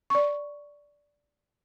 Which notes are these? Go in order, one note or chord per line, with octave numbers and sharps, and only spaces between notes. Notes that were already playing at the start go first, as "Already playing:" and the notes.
D5 C#6